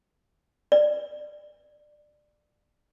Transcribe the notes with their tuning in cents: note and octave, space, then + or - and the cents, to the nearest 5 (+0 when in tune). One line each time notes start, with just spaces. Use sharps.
D5 +20